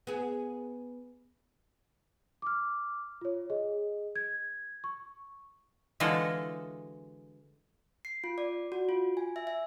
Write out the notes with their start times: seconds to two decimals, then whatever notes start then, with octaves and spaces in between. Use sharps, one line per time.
0.07 B3 G#4
2.42 D6 F6
3.21 F4 C#5
3.50 G#4 D#5
4.16 G#6
4.84 C#6
6.00 D3 E3 G#3 F4 F#4 A4
8.05 C7
8.24 F4
8.38 D5
8.72 F#4
8.89 F4
9.17 G#5
9.36 E5
9.47 E5